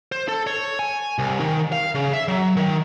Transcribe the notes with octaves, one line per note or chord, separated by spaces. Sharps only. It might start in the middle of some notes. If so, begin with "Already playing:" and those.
C5
A4
C#5
G#5
C2
D#3
F5
C#3
E5
F#3
D#3